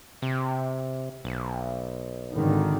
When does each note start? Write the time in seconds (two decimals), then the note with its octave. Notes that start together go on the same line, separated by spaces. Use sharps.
0.22 C3
1.24 B1
2.34 G#1 D3 D#3